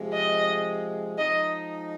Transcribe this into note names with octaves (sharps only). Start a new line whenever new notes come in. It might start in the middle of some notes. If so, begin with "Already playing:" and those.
Already playing: C3 F3 G#3
D#5
F3 G#3 D#4 D#5